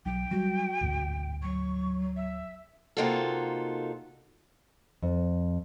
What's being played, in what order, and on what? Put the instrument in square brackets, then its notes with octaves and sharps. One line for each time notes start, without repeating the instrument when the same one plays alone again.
[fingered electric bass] B1 F#3 [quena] G5
[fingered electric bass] F#3 G3 [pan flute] F#4
[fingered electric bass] G#1 D2 A2
[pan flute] F#3 [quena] C#6
[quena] E5
[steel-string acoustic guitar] C3 A#3 D#4 F4 F#4 A4
[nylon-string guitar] F2